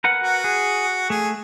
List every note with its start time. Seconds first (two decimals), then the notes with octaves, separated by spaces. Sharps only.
0.04 A#4 B4 F#5
0.23 F#4
0.44 G#4
1.10 A3 G#4